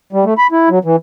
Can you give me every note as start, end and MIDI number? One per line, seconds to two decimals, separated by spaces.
0.13 0.25 55
0.25 0.34 57
0.38 0.47 83
0.52 0.69 64
0.69 0.79 54
0.85 0.96 52